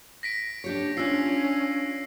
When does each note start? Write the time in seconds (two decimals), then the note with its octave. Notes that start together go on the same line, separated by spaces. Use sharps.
0.23 A#6 B6 D7
0.64 D4 G4 C#5
0.97 C#4 D4 F4 E6 C7